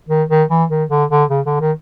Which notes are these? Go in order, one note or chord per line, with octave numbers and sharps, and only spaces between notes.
D#3
D#3
E3
D#3
D3
D3
C#3
D3
D#3